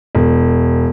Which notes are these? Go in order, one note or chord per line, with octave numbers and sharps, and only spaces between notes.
E1